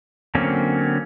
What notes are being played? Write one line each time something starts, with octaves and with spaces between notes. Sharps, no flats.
D3 F#3 A#3 C4 C#4